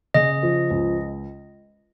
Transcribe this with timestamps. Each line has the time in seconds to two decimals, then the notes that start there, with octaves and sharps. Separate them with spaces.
0.14 C#3 D#5
0.43 F3
0.70 C#2